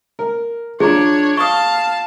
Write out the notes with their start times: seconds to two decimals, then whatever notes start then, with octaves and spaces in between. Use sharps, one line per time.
0.19 A#4
0.80 F3 D4 G#4 C#5 A#5
1.37 F5 A5 C#6 D#6